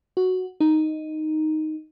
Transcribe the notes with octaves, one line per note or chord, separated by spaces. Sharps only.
F#4
D#4